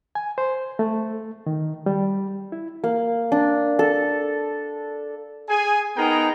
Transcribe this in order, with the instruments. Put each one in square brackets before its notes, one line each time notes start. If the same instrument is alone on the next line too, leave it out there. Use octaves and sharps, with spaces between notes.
[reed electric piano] G#5
C5
A3
D#3
G3
E4
[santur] A#3
D4
A4
[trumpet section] G#4 G#5
B3 D#4 G#4 A#4 G5 A#5